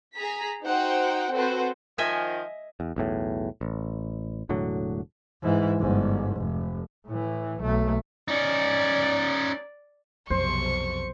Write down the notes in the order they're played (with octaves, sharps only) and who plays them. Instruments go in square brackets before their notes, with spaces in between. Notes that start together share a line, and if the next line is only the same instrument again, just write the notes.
[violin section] G#4 A#5 B6
D#4 F#4 C5 F#5 G5
C4 F#4 A4 B4 C5
[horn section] D#3 F3 [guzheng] D#5 E5 G#5
[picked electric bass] E2
B1 E2 A2
A1
E1 A2 D3 F#3
[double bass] G#2 E3
G1 G#2
F1
A2 E3
B1 A3
[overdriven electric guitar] C#4 D#4 [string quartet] D5
[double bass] B1 C3 [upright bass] F2 [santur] C5 [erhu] C#6